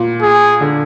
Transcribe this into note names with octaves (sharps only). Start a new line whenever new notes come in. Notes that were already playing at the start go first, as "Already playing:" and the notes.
Already playing: A#2
G#4
D3